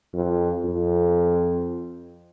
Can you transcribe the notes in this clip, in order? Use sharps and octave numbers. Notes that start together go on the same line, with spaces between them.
F2
F2